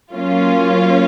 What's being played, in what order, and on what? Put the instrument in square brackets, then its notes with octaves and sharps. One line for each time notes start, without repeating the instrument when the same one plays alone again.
[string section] F#3 A#3 C#4 F4